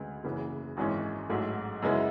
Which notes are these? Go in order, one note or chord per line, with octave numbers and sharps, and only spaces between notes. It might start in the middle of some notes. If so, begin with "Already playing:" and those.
Already playing: D2 C#3 G#3 B3
F#1 F#2 C#3 E3 B3
G#1 F#2 E3 G#3 C#4
A1 G#2 F#3 A3
F#2 C#3 G#3 B3 E4